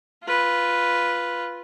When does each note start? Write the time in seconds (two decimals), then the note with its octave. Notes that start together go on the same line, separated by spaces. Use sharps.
0.23 F4 B4